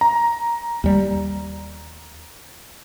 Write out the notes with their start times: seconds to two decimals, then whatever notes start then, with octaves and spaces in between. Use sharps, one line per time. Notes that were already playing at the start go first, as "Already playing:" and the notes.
0.01 A#5
0.84 D#2 G3